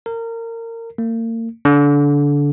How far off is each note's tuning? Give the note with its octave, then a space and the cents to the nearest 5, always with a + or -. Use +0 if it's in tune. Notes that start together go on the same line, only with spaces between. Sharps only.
A#4 -25
A#3 -40
D3 -25